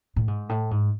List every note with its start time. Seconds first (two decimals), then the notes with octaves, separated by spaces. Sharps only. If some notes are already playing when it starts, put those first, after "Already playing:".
0.16 A2
0.28 G#2
0.49 A2
0.71 G#2